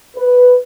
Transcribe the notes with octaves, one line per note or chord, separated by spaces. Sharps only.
B4